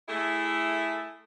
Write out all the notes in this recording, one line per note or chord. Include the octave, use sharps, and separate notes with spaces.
A3 E4 G#4 A4